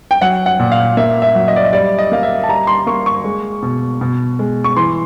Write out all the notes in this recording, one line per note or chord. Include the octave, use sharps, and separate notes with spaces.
G5
F#3 F#5
F#5
A#2
F5
A#3 E5
E5
F#3
D#5
D5
D#5
G3 D5
D#5
A#3 F5
E5
A5
G3 A#5
C6
A#3 C#6
C#6
G#3
B2
B2
G#3
C#6
E3 C6